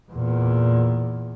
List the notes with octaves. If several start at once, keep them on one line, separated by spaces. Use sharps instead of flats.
E2 A#2